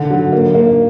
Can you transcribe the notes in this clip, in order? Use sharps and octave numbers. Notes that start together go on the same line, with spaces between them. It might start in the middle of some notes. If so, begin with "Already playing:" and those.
Already playing: D3
F#3
A#3
A#3